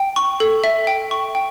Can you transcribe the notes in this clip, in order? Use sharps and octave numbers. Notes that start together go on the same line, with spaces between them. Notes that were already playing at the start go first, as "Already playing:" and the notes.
Already playing: G5
C#6
A4
E5
G5
C#6
G5